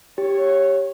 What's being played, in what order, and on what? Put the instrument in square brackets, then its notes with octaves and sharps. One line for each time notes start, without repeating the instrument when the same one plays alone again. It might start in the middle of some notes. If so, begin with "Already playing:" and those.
[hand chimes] G4 [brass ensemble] C#5